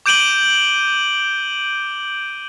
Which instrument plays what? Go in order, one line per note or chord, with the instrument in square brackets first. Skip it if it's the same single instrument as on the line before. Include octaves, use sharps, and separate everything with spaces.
[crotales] D6 G6 D7 D#7 F#7 G7